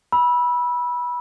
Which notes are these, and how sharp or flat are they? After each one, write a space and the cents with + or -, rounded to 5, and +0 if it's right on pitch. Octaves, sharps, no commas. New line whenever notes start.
B5 -20 E6 -5